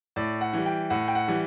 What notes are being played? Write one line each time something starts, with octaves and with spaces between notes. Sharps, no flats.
A2 D5
F#5
E3 G3
G5
A2 F#5
G5
F#5
E3 G3